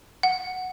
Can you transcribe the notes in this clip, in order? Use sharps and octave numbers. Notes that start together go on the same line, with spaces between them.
F#5